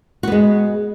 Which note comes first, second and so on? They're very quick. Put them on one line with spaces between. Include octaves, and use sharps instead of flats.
F#4 B3 G#3